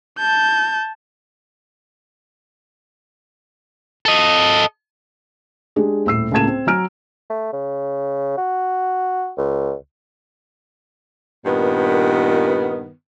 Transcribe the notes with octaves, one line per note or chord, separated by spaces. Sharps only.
A5 G6
A4 D#5
G#3 D4 G4 G#4
D#1 A2 E6 C7
C#2 A2 A#3 A5 G#6 E7
C4
F#3 G#5 A#5 F6 D7
A3
C#3
F#4
C#2
G2 A#2 D#3 B3